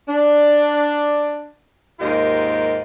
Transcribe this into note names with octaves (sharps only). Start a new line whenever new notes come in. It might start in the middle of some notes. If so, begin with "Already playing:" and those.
D4
D#2 G#2 F4 G4 A#4 D#5